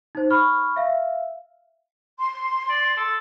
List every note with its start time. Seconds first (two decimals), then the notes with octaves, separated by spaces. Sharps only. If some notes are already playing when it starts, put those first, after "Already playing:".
0.15 D#4 C5
0.30 B5 C#6 F6
0.76 E5 F5
2.18 C6
2.69 D5
2.97 A4